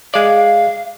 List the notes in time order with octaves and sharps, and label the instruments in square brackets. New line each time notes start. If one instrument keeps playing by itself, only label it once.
[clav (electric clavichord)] G#3 D5 [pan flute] F5